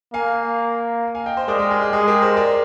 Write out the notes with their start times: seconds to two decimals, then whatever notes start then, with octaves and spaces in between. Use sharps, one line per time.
0.14 A#3 F5 G#5
1.15 F5 G#5
1.26 D#5 G5
1.37 C5 D#5
1.48 G#3 A#4 D5
1.59 G4 A#4
1.71 G#4
1.82 G4
1.93 G#3 G#4
2.07 G4 A#4
2.22 G#4 C5
2.37 A#4 D5